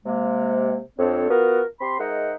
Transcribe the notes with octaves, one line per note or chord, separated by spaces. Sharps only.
C3 G#3 A#3
F2 F3 C4 D4 A4 C#5
B3 F4 F#4 A#4
C4 G4 B5 C6
G#3 D#4 A#4 C5 E5 F#5